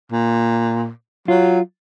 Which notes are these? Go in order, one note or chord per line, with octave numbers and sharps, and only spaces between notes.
A#2
F#3 F4